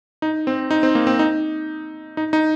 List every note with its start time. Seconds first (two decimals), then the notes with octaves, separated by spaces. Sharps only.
0.22 D#4
0.47 C4
0.71 D#4
0.83 C4
0.95 A#3
1.07 C4
1.19 D#4
2.17 D#4
2.33 D#4